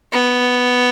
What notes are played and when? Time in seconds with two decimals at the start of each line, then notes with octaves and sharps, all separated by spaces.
0.13 B3